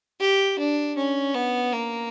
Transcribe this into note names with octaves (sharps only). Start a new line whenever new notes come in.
G4
D4
C#4
B3
A#3